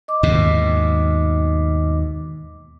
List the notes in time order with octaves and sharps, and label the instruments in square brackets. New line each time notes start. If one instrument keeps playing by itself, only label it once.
[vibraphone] D#5 D6
[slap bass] D#2 G#2 B2